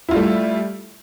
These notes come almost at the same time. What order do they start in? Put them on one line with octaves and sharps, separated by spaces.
E4 F4 G3 A3